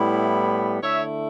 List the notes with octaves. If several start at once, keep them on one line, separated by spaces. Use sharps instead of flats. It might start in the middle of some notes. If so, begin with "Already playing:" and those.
Already playing: A2 G3 B3 E4
D3 A3 E4 C#5 E5